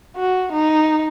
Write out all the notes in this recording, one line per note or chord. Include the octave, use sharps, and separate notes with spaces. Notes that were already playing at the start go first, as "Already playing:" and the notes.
F#4
D#4